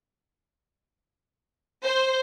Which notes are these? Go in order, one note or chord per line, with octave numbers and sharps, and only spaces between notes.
C5